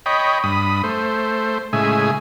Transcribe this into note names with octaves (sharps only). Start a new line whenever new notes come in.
C#5 D#5 G5 B5
G2 B5 D#6
A3 C5
A2 C#3 G#3 E5 G#5